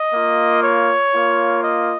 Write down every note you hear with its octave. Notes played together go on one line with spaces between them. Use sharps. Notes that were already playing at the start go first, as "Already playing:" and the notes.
Already playing: D#5
A#3 F4
C#5
A#3 F4
D#5